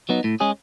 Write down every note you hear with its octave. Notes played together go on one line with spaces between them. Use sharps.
F#3 B3 D#4
A2
G#3 C#4 G#4